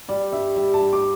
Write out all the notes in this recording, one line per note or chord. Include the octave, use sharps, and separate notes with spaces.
G3 D5
G2 E5
G3 E5
A5
G2
D6